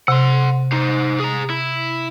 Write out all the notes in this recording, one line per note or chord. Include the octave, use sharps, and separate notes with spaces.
C3 F#5 C6
D#4 C5
G#4 A#5
E4